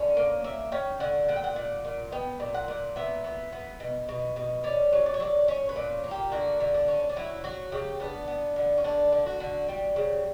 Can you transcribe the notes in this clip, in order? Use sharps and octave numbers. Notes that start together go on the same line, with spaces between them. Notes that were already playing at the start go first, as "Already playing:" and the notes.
Already playing: D3 C#4
A#3
A#3 E5
C#4 G5
D3 F#5
A#2 F#5
G5
F#5
A#2
A#2
B3 G5
A#2
F#5
A#2
B3 E5
B3
B3
B2
B2
B2
C#4 D5
F#3
D5
C#5
F#3 D5
C#4 C#5
B4
A#2
A#3
G4
D3 F#4
D3
D4
C#4
D4
F#3 E4
F#3 F#4
C#3 G4
B3 D4
B3
D3
C#4
D3 D4
D3
F#4
D3
G3
C#3